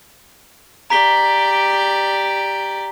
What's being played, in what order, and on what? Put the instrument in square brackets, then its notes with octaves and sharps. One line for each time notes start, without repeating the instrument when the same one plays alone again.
[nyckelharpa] G4 D5 [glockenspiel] A#5 B6 G7